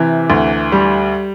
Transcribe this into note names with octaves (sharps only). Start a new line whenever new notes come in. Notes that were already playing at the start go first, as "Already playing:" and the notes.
Already playing: C3 E3
D2
G3